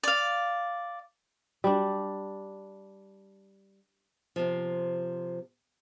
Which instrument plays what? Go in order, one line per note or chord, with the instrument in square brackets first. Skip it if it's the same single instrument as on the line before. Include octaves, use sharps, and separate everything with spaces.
[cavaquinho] D5 F5
[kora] G3 D4
[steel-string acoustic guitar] C3 F3